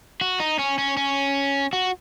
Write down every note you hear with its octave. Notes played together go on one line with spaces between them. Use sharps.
F#4
D#4
C#4
C#4
C#4
F#4